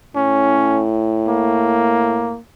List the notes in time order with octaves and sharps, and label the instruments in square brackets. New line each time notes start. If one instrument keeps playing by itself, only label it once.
[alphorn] A2 [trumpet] C#4
[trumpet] A#3